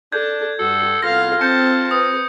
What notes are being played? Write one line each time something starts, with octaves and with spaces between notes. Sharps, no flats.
D4 A4 G6 G#6
G2 F#4 A4
C2 B3 F4 A4 F5 A#6
C4 A5 G6 C#7
B4 D#6